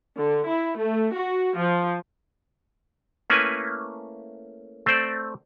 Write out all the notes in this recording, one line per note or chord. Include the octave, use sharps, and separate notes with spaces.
D3
E4
A3
F#4
F3
A3 A#3 C#4 E4 B4 G#5
A3 C4 C5 D5